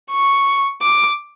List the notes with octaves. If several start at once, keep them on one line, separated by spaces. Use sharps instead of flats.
C#6
D6